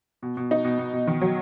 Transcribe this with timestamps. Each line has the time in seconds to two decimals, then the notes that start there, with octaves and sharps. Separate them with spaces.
0.22 B2
0.37 B2
0.51 D#4
0.64 B2
0.79 B2
0.93 B2
1.07 D#3
1.21 F#3